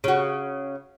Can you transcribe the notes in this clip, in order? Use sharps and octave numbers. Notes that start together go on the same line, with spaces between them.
C#3 F#4